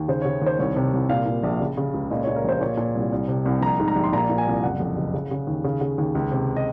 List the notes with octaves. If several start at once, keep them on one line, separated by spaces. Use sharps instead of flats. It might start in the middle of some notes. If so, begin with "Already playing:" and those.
Already playing: D#2
C#3 C5
C#3 C#5
D#2 C5
C2 C#5
C3
C2
A#2 F5
A#2
A#1
C#3
C#3
C#2
A#2 D#5
A#2 C#5
A#4
A#1 C5
A#2 C#5
A#2
C2
C2
C3
C2
A#1 A#5
G#2
A#5
A#1
C6
A#2 A#5
A#2
G#5
C2
F#1 F#5
F2
F#1
C#3
C#3
D#2
C#3
C#3
D#2
C#2
C3
D#5